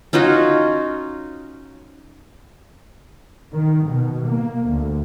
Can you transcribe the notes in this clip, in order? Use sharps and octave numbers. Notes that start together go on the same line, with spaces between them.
C#4 D#4 F4 F#4
D#3
B2
A#3
D2